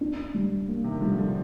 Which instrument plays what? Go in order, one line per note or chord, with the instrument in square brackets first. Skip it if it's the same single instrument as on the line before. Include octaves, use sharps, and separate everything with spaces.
[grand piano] D4
G3
A#3
[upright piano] C3 D#3
[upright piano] D3 F3 [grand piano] G3
[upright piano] D3 F3